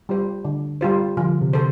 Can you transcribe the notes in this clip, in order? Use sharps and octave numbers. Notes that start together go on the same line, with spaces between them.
G3 F4 C5
D3
G3 F4 C5
D3 F3
C3
A4 C5